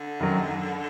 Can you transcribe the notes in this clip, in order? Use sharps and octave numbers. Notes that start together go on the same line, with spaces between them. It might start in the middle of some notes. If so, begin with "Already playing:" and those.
Already playing: D3
F#2 D#3 F#3